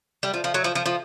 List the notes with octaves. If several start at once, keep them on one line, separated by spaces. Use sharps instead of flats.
G3
F3
F3
F#3
F3
F3
F3